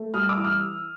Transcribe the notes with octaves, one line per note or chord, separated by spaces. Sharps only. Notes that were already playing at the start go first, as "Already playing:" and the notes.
Already playing: A3
G3 D#6 F6
D6 E6
E3
D#6 F6